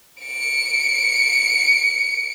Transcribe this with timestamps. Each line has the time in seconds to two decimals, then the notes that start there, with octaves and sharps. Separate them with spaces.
0.22 C#7 D7